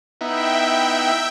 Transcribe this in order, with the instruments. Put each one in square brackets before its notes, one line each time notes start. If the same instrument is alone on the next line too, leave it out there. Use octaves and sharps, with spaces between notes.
[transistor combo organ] B3 D#4 E4 [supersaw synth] E5 G5